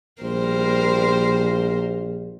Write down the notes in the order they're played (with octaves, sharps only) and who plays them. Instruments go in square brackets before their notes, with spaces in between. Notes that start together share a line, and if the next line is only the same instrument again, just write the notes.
[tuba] A#1 [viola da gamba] G3 A#4 C5